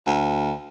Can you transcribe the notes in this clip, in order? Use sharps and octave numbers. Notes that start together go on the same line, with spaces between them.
D2